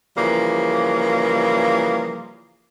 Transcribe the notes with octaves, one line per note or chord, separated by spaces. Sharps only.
C#3 E3 F3 G3 A#3